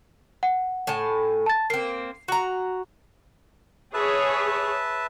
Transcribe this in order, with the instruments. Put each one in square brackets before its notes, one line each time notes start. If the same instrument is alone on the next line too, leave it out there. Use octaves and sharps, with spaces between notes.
[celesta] F#5
[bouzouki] A2 G#5 A5
[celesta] A5 A6
[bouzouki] A#3 C4 [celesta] C7
[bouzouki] F#4 A#5
[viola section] G#4 C#5 [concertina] B4 E5 A5